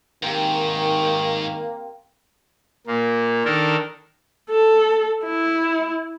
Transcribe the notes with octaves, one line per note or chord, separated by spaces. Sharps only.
G#2 D#3 A#3 C4 G4
A#2 A#3
D#3 D4 A4 A#4
A4
E4